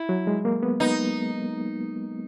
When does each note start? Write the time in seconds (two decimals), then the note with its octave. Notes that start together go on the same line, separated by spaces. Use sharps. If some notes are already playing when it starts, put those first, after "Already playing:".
Already playing: E4
0.09 F#3
0.27 G#3
0.45 A#3
0.63 B3
0.80 B3 D#4